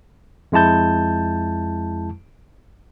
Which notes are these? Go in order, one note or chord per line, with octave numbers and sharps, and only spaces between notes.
F2 G#3 E4 A5 G6